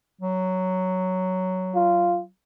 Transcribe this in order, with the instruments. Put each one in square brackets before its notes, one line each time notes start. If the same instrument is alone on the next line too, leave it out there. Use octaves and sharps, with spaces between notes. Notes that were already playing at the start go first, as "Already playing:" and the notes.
[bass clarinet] F#3
[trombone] F4